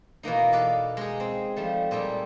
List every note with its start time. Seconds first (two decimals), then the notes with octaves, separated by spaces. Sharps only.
0.23 B2 E3 A#3 D#4
0.52 A4 B4 D5 F5
0.97 G#3 D#4 G#4
1.20 C4
1.56 F3 G3 A3
1.91 A#2 G3 G#4 A4